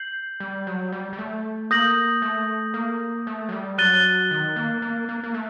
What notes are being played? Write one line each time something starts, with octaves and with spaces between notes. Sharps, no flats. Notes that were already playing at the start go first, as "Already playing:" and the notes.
Already playing: G6 C7 F#7
G3
F#3
G3
G3
A3
A#3 D#6 G6 A#6 F#7
A3
A#3
A3
F#3
G3
F#3 F#6 A6 D#7 G7
D#3
A#3
A#3
A#3
A#3
A3